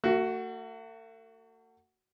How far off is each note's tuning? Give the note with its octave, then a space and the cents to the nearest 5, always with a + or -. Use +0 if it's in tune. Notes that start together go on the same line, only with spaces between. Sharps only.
A3 +45 F#4 +10